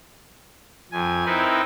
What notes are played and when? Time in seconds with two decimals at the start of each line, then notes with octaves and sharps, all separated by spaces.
0.92 F2 G#5
1.26 C4 D#4 E4 A#4 B4